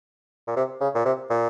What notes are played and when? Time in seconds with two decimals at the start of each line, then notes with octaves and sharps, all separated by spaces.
0.47 A#2
0.56 C3
0.81 C#3
0.94 A#2
1.05 C3
1.30 A#2